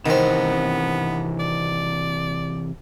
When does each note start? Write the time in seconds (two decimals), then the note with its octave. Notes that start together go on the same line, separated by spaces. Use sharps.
0.06 C3 D#3 E3 B3 C4
1.39 D5